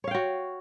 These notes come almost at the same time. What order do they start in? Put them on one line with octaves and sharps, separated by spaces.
C#5 F5 G5 F#4